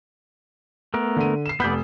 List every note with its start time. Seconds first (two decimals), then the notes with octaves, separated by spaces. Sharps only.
0.94 A3 B3 A#4
1.16 D3 D#7
1.46 C7 E7
1.60 F1 B3 D5 G6 B6